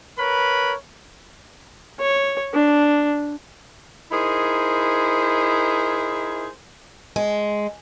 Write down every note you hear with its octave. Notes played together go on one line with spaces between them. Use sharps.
A#4 B4 C#5 B5
C#5
D4
D#4 E4 G#4 A#4 C5
G#3